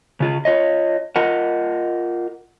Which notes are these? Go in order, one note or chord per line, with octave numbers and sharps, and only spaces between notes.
C#3 F4 G#4
F4 C#5 D#5
F4 A#4 D#5 F#5